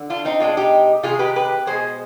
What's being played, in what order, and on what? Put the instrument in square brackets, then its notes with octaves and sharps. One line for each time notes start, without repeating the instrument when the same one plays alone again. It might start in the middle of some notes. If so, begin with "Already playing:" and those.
Already playing: [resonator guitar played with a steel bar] D3
D4 F4
C4 D#4
B2 G#3 D4 F4
D#4 G4
C3 D#3 G#3 F4 G#4
G4 B4
G4 B4
B2 G#3 G#4 C5